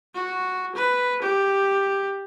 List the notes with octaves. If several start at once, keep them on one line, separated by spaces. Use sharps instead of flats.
F#4
B4
G4